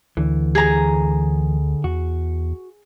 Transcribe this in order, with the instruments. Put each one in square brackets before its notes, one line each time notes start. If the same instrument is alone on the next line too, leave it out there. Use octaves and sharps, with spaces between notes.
[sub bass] D2 [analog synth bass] D3 [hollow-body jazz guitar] E3
[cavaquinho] G#4 A#5
[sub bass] E2 [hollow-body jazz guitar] F#4